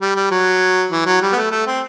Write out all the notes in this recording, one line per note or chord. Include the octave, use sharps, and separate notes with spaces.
G3
G3
F#3
E3
F#3
G3
B3
A3
A3
C4